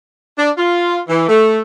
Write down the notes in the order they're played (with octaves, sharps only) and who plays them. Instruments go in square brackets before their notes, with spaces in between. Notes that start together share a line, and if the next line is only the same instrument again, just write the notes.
[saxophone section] D4
F4
E3
A3